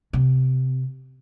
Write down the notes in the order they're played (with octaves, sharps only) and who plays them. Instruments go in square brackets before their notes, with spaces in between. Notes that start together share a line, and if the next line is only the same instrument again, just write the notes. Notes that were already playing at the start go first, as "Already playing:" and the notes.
[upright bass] C3